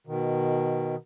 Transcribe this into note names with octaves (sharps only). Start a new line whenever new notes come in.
B2 D#3